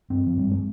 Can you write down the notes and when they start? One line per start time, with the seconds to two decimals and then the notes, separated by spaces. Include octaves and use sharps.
0.10 G2 C4
0.27 G2 F3
0.39 G3
0.46 G2
0.51 G#3